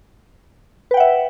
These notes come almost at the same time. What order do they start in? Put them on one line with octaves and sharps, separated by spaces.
B4 G5 F#5 E5